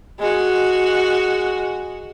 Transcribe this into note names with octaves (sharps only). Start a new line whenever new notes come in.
G#3 F#4